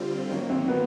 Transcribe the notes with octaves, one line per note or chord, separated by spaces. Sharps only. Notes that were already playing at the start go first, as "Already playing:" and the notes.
Already playing: D3 G3 C4 F4
D#3 F#3 A#3 C#4
C4
B3